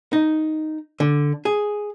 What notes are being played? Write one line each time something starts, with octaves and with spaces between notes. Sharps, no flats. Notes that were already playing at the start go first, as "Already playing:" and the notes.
D#4
D3
G#4